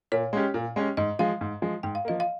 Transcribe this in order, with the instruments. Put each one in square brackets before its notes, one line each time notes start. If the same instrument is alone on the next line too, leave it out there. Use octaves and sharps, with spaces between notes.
[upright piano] A#2 [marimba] C#5
[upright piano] G#3 C#4 G4
A#2
G#3 C#4 G4
[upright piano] G#2 [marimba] D#5
[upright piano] F3 G#3 [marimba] F5
[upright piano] G#2
F3 G#3
[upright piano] G#2 [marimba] G5
[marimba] F5
[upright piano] F3 A#3 [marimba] D#5
[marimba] F5